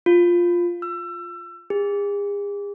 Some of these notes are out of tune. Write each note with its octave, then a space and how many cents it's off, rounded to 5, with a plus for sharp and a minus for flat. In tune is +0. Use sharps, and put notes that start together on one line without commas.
F4 +0
E6 +30
G#4 -40